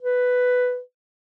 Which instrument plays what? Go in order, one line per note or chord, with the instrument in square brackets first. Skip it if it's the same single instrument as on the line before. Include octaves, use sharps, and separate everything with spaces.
[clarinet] B4